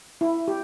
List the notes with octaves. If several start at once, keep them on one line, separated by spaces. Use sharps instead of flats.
E4
G4